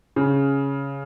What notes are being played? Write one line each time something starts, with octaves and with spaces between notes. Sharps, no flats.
C#3